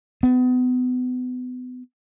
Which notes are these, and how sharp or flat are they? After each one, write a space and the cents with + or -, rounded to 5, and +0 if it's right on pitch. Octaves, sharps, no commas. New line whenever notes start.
B3 +30